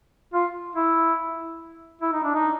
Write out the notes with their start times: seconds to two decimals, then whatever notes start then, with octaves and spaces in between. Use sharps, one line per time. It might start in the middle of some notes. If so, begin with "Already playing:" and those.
0.33 F4
0.76 E4
2.01 E4
2.13 D#4
2.23 D4
2.35 D#4